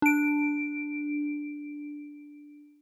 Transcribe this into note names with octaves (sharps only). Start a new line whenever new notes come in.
D4 D7